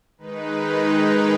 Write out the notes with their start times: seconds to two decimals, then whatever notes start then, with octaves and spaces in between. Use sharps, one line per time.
0.18 D#3 G#3 D#4 B4
0.98 A#4